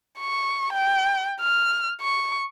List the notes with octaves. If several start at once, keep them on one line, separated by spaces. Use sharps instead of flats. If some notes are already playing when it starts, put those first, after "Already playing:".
C#6
G5
F6
C#6